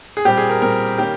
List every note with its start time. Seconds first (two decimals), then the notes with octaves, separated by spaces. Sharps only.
0.17 G#4
0.25 A#2 G3 C4 G4
0.37 G#4
0.49 A#4
0.62 A#2 G3 C4 A#4
0.98 D#3 G3 A#3 C#4 G4